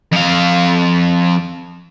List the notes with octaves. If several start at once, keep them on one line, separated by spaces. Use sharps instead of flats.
F2 F5